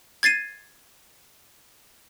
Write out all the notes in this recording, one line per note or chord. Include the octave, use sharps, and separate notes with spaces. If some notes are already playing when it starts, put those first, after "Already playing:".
G#6 A6 C7 D#7